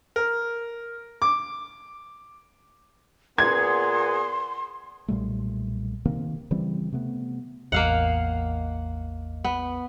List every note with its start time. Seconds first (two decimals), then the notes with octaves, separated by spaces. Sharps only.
0.16 A#4
1.22 D6
3.38 A#2 B3 G#4 C6 G#6
5.08 B1 A#2 G3 A3
6.05 C3 D#3 A#3 C4
6.51 C#3 E3 G3 C4
6.92 C3 A3 B3
7.72 A1 E2 A#3 D#5 F5 F#5
9.44 B3